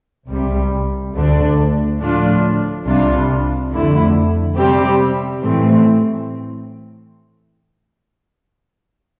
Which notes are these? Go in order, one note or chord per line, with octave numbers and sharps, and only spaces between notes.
C2 C3 G3
D2 D3 A3 D4
A2 F3 A3 D4 F4
C2 C3 G3 D4 F4
F2 D3 A3 E4
C3 G3 C4 G4
A2 E3 A3 C4